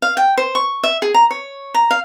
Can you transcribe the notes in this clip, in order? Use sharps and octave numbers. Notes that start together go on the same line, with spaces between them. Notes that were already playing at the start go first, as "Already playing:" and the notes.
F5
G5
C5
C#6
E5
G#4
A#5
C#5
A#5
F5